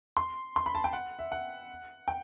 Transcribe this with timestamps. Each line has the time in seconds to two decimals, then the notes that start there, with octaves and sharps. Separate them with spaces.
0.17 C6
0.56 C6
0.66 B5
0.75 A5
0.84 G5
0.93 F#5
1.19 E5
1.32 F#5
2.08 G5